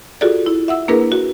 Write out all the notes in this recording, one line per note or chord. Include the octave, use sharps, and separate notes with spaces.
F4 F#4 G#4 A4 D5
E4
E5 F#5 E6
A#3 D4 E4 G#4 A#4 B4
F#4